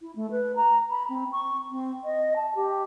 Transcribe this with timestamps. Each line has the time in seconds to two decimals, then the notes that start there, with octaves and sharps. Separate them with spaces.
0.01 E4
0.16 A3
0.31 B4
0.56 A#5
0.91 B5
1.09 C4
1.32 C#6
1.70 C4
2.04 D#5
2.36 A5
2.55 G4